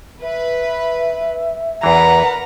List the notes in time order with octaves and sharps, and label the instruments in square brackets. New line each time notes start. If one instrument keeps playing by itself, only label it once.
[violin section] B4 [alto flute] E5
[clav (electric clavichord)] E2 E3 [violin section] A#4 B4 F#5 [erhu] A#5